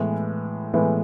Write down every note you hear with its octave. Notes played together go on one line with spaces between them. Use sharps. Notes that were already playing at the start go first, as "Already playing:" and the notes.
Already playing: A2 E3 G#3 B3
A2 E3 G#3 B3